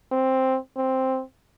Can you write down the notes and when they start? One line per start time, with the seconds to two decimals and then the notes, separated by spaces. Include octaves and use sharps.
0.12 C4
0.77 C4